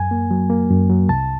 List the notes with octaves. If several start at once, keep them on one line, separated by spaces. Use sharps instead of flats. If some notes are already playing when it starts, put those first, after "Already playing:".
Already playing: F#2 G#5
A#3
F#3
A#3
F#2
F#3
C2 A5